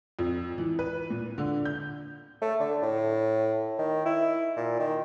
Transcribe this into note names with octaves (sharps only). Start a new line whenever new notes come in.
F2
E3
B4
A#2
D3
G6
A3
D3
A2
D#3
E4
A#2
D#3